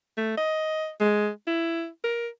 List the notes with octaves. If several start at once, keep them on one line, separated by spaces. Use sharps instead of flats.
A3
D#5
G#3
E4
A#4